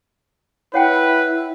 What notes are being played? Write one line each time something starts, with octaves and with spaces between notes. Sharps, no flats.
E4 B4 C#5 F#5 G5